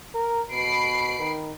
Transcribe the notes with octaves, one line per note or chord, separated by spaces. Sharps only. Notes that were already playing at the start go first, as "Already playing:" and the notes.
A#4
B2 B5 C7 D7
D#3